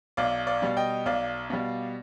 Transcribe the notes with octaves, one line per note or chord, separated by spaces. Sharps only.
B1 D5 F5
D5 F5
B2 G3
D#5 G5
B1 D5 F5
B2 G3